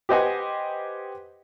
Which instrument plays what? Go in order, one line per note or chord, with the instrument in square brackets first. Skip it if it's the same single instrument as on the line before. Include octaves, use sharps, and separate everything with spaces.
[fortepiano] G4 B4 C5 D#5 F#5 G#5